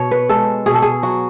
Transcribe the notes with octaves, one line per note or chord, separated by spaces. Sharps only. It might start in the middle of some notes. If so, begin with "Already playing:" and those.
Already playing: B2 C#5
B4
G#3 A4
B2 G#4
A4
G#4
F#3 F#4